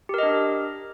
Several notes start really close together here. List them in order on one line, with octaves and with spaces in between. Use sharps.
G4 A#4 D#5 D4